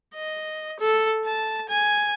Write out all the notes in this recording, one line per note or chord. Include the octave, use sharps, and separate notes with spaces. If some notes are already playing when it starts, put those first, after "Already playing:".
D#5
A4
A5
G#5